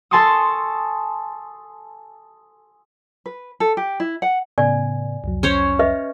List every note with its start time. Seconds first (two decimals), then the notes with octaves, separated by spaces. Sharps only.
0.11 A4 G#5 A5 C6 C#6 D#6
3.26 B4
3.60 A4
3.77 G4
4.00 E4
4.22 F#5
4.58 A2 C#3 B3 D5 G#5
5.24 C2 F2 F#3
5.43 C#4 C5 C#5
5.79 B4 D#5 E5